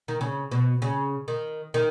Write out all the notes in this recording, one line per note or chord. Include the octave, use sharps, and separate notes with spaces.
D#3
C#3
B2
C#3
D#3
D#3